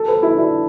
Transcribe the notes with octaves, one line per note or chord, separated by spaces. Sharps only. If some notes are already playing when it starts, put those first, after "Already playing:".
Already playing: A4
B4
E4
D4
E4